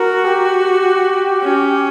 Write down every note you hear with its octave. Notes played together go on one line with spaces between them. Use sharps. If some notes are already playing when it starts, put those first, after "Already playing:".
Already playing: F#4 A#4
G4
C#4